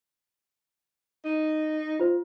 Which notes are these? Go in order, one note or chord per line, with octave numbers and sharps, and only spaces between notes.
D#4
F4 C5